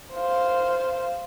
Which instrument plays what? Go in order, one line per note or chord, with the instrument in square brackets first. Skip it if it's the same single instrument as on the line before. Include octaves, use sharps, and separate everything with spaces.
[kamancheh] C5 F5